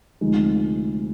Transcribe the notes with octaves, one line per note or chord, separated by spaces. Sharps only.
D2 C3 F3 G#3 D#4